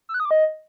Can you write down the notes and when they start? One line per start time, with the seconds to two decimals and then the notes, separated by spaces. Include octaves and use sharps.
0.09 E6
0.14 F#6
0.20 D#6
0.25 D6
0.31 D#5